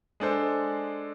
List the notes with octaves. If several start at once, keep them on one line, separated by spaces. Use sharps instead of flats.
G#3 D4 A4 C5